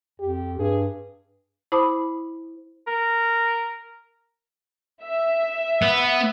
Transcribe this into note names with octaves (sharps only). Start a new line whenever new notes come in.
F2 G4
G2 G#4
E4 C5 A5 B5 D6 D#6
A#4
E5
B3